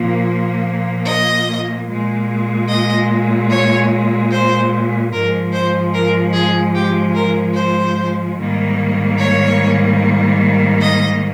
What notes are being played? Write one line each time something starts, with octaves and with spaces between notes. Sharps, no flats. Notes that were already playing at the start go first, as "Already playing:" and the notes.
Already playing: A#2 F3 A#3
D#5
A#2 G#3
D#5
C#5
C5
G#2 F3 G#3 A#4
C5
A#4
G#4
G4
A#4
C5
G#2 D#3 G3 A#3
C#5
D#5